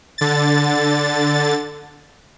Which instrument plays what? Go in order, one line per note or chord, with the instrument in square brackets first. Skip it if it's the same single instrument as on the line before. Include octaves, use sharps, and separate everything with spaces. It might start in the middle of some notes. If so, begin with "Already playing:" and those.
[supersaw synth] D3 A6